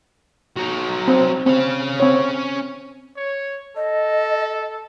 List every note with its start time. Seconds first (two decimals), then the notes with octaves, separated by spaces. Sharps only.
0.57 F#3 D#4
1.08 C4
1.46 C4 C#4 F5
2.00 C4 C#5
3.16 C#5
3.76 A4 D#5